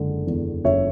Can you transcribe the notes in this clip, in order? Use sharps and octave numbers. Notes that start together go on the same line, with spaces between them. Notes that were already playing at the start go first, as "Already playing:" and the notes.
Already playing: F#1 D3 G#3
E2
F#1 C#5 E5